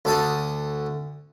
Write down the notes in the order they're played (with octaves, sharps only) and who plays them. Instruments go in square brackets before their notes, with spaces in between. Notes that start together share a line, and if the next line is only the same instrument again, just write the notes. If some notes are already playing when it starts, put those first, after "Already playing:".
[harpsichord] D2 A4 A5 D#6